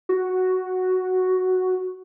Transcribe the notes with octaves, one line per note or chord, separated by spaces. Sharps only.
F#4